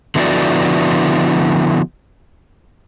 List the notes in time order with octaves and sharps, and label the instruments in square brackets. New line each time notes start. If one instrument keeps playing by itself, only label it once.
[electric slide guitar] D3 F3 B3 E4 F#4 D5